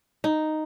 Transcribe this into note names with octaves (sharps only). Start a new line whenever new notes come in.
D#4